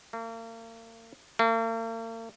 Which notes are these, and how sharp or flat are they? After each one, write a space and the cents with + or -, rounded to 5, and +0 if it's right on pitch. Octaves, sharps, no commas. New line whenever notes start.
A#3 -40
A#3 -45